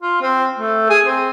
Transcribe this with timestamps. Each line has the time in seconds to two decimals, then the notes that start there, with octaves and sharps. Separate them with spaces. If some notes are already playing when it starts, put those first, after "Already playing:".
0.01 F4
0.22 C4
0.59 A3
0.90 G#4
1.05 C4